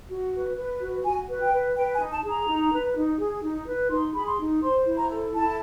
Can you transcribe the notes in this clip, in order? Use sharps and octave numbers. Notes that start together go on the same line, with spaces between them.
F#4
B4
B4
F#4
F#4 G#5
B4
G5
B4
B4 G5
G#5
D#4
A5
G#4
A#5
D#4
B4
D#4
G#4
D#4
B4
D#4 C6
G#4 B5
C6
D#4
C5 C6
E4
A#5
A4
E4 A5